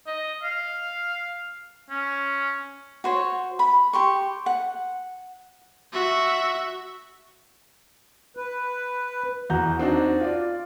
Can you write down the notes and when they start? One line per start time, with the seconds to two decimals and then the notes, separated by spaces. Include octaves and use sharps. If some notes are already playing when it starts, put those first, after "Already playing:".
0.07 D#5
0.43 F5
1.90 C#4
3.04 F#4 C5 C#5
3.59 B5
3.93 G4 C6 C#6
4.46 F#5
5.93 F#4 E5
8.37 B4
9.50 E2 F#4 A#5 G6
9.79 C4 D4 D#4 F#4
10.20 F4 D5